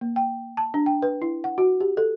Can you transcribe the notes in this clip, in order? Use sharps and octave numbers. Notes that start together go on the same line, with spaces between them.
A#3
G5
A5
D4
G5
B4
E4
F#5
F#4
G4
A4